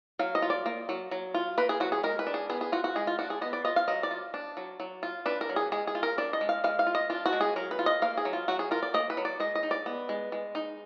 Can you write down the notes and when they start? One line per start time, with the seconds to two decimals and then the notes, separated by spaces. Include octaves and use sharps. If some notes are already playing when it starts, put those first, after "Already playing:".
0.19 F#3 F5
0.35 D#5
0.42 F4
0.50 D5
0.66 A#3
0.89 F#3
1.11 F#3
1.34 F4
1.58 A#3 B4
1.69 G#4
1.80 F#3 F#4
1.92 G#4
2.03 G#3 A#4
2.19 B4
2.27 D4
2.34 G#4
2.49 B3 G#4
2.61 G#4
2.72 F4 F#4
2.84 F#4
2.96 G#3 G#4
3.07 F4
3.19 D4 F#4
3.30 G#4
3.41 B3 D#5
3.53 D5
3.65 F4 D#5
3.76 F5
3.88 F#3 D#5
4.03 D5
4.11 F4
4.34 D4
4.57 F#3
4.80 F#3
5.03 F4
5.26 D4 B4
5.41 A#4
5.49 F#3
5.56 G#4
5.72 G#3 G#4
5.87 G#4
5.95 F4
6.03 A#4
6.18 D4 D5
6.33 D#5
6.41 G#3
6.49 F5
6.64 G#3 F5
6.79 F5
6.87 F4
6.95 D#5
7.10 D4 F4
7.26 F#4
7.33 G#3
7.41 G#4
7.56 F#3 A#4
7.71 B4
7.79 F4
7.86 D#5
8.02 A#3 F5
8.17 G#4
8.25 F#3
8.33 F4
8.48 F#3 F#4
8.59 G#4
8.71 F4 A#4
8.82 D5
8.94 A#3 D#5
9.10 B4
9.17 F#3
9.25 D5
9.40 G#3 D#5
9.55 D#5
9.63 D#4
9.71 D5
9.86 B3
10.09 G#3
10.32 G#3
10.55 D#4